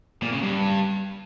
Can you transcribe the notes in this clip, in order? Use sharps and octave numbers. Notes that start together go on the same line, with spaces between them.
A#2
C#3
G2